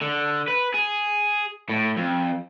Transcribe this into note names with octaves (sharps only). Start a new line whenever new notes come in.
D3
B4
G#4
A2
F2